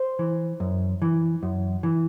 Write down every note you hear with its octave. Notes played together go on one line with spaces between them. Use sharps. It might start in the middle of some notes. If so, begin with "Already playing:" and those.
Already playing: C5
E3
F#2
E3
F#2
E3